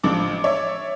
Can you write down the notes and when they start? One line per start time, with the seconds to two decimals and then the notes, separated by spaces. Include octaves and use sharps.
0.04 A1 F3 D4 D6
0.44 C#5 D5 E5